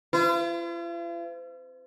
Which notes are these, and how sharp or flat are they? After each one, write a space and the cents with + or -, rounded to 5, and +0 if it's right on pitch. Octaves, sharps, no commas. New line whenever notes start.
F4 -45 C5 -45